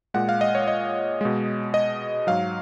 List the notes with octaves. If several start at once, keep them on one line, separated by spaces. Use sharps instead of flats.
A#2 G#3 F#5
F5
D#5
C#5
D#5
B2 G#3
D#5
G#2 F#3 F5